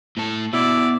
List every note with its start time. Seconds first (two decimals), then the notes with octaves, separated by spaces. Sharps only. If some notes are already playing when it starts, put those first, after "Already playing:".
0.17 A2 A4
0.53 B2 E4 D5